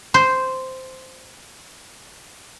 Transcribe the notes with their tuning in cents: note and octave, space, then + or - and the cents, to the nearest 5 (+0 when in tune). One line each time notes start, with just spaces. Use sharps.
C5 -5